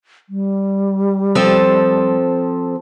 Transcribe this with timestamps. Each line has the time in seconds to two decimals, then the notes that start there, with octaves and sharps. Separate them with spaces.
0.29 G3
1.35 F3 C4 A4